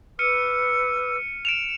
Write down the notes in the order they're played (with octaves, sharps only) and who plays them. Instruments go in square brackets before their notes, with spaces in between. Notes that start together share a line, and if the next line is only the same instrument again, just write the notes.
[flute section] B4 D6 E6 [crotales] F6 C#7 D#7
[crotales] D7 E7 F7